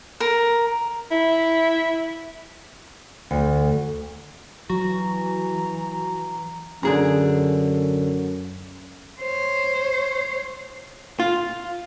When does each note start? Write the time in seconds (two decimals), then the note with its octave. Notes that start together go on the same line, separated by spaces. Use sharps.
0.20 A#4
1.11 E4
3.31 D2
4.70 E3 F#3 F#4 A#5
6.83 F#2 D3 G#4 A#5
9.21 C5 C#5
11.20 F4